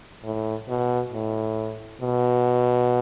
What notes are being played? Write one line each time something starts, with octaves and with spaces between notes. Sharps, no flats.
A2
B2
A2
B2